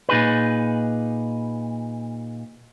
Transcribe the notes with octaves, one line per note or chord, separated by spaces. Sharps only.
A#2 D#4 G#4 B4